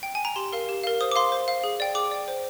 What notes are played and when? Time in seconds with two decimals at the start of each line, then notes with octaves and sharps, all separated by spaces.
0.03 G5
0.15 G#5
0.25 A#5
0.36 G4 C6
0.53 A#4 F5
0.69 G4
0.84 A#4 F5
1.01 C5 D#6
1.12 D6
1.16 F5 C6
1.32 C5
1.48 F5
1.64 G#4
1.80 D5 G5
1.95 G#4 D6
2.11 D5 G5
2.28 C5